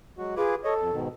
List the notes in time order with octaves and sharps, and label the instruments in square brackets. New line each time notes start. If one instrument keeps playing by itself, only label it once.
[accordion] F#3 G#3 F#4
[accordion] F4 B4 D6 [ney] G#4
[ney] A4 [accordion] C#5 D#5
[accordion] F2
G#2 B2 D#3